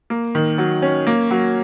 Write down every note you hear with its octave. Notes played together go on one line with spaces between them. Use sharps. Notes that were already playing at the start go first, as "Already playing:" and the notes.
A#3
D#3
F#3
C#4
A#3
F#3